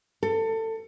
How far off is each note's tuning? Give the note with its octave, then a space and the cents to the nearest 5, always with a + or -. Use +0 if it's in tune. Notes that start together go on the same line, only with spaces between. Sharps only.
A4 +25